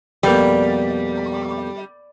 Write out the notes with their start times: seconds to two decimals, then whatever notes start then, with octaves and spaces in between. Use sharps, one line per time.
0.23 F2 B2 G3 A#3